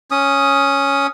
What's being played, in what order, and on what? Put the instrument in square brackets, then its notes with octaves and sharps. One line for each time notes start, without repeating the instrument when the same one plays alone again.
[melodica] C#4 D#6